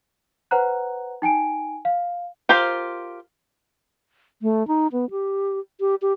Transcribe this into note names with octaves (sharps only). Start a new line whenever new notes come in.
B4 C5 F#5 A#5 F#6
D#4 G5 G#5 D7
F5
F4 G4 A#4 C5
A3
D#4
B3
G4
G4
G4